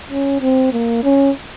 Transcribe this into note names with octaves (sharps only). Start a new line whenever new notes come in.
C#4
C4
A#3
C#4